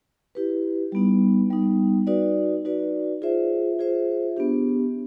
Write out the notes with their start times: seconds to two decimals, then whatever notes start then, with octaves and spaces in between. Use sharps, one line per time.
0.35 E4 G4 B4
0.92 G3 B3 D#4
1.50 G3 B3 D#4
2.07 D#4 F#4 B4 D5
2.65 D#4 F#4 B4 D5
3.22 F4 G#4 C5 E5
3.79 F4 G#4 C5 E5
4.37 B3 D4 G4